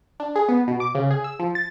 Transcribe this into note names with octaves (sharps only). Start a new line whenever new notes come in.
D4
G#4
B3
B2
D6
C#3
G#4
E6
F3
A6